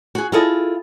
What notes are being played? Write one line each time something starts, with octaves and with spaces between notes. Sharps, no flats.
F#4 G#4
E4 F4 G#4 A4 D#5